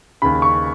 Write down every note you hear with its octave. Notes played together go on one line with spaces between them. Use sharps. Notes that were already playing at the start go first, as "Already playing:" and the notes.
D#2 C#3 B5
C#6